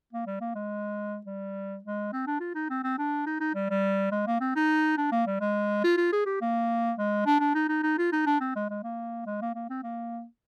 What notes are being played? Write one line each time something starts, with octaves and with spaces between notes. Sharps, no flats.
A#3
G3
A#3
G#3
G3
G#3
C4
D4
F4
D#4
C4
C4
D4
D#4
D#4
G3
G3
G#3
A#3
C4
D#4
D4
A#3
G3
G#3
F4
F4
G#4
G4
A#3
G#3
D4
D4
D#4
D#4
D#4
F4
D#4
D4
C4
G#3
G#3
A#3
G#3
A#3
A#3
C4
A#3